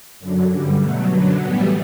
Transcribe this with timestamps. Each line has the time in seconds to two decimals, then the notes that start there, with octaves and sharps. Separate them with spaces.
0.20 F#2 D3 F#3
0.50 G2 D3 G3
0.81 B2 F#3 A3
1.11 F#2 D3 F#3 B3
1.42 A2 E3 G3 B3